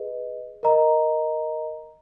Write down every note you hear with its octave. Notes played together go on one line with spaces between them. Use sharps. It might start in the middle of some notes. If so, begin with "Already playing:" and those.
Already playing: G#4 B4 D#5
A#4 D#5 A#5